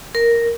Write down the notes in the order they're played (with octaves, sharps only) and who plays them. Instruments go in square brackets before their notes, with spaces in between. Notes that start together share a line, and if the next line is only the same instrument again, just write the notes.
[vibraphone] A#4